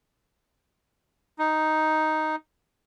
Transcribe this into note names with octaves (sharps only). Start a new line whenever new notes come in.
D#4